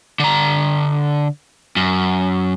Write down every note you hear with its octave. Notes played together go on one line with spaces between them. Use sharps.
D3 A#5
F#2